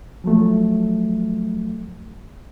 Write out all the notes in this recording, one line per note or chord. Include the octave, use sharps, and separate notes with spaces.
F3 F#3 A3